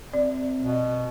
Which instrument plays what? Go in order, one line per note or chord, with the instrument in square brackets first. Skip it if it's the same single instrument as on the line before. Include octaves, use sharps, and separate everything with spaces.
[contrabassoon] C3 [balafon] D5
[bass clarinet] B2